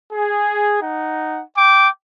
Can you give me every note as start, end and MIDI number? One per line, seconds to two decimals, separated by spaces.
0.13 0.81 68
0.82 1.43 63
0.82 1.43 78
1.57 1.89 79
1.57 1.89 86